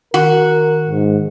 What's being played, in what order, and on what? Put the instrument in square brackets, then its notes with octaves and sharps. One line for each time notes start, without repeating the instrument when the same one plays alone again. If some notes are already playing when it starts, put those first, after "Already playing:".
[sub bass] D#3 [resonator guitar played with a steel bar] F#4 [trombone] A#4
[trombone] G#2